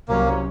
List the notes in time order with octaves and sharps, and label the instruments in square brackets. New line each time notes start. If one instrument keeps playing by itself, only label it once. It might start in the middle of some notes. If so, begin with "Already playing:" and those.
[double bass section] C2 C3 F#3 C#4 [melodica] A#3